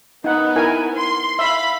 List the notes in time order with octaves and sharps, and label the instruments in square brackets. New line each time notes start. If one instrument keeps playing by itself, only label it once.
[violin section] B3 [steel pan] D#4 F#5
[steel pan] E4 A#4 G#5
[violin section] C6
[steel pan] E5 [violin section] F5 B5